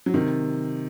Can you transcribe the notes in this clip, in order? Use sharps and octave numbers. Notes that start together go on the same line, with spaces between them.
F#3
C3 D#3